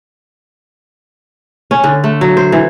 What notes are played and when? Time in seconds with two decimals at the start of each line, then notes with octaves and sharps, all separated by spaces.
1.71 C#4
1.84 D3
2.04 A3
2.21 F#3
2.37 C5
2.52 E3